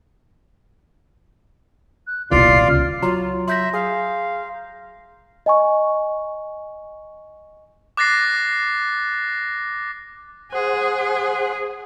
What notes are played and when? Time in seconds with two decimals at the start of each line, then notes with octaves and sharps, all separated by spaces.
2.06 F#6
2.31 D#1 C2 B2 F4 D5 F5 C7
2.68 C#2 F6
3.03 F#3 F4 A#5 C6
3.48 E5 C6 G6 A#6
3.74 G#4 F5
5.46 D#5 G#5 C#6
7.97 D6 F#6 A6 A#6 C7
10.52 G#4 C5 F#5